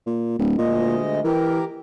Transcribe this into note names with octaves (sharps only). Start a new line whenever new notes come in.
A#2
D1
D2 A#2 G#3 D#5
E3 G4 A#4